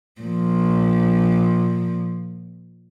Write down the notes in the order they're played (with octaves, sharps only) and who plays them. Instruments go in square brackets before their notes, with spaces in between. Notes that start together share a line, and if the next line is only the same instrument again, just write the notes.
[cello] A#2 F3